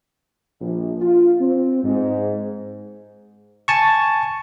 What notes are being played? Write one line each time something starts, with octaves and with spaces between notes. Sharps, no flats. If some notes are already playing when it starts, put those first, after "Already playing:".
A#1
F4
C4
G#2
G#5 A5 C#6